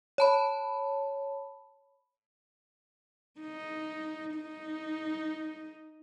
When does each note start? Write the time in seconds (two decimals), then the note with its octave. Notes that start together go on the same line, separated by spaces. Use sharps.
0.18 C#5 A5 B5
3.41 D#4
4.36 D#4